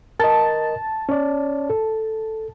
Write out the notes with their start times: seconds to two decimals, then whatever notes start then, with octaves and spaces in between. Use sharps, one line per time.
0.20 A#4 D#5 A5
1.09 C#4 C#5 D5
1.70 A4